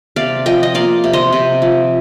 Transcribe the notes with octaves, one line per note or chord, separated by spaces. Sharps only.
C3 D5 F5
F3 D#5 G5
D#5
A#3 D5 F5
C3
C5 D#5
C3
F3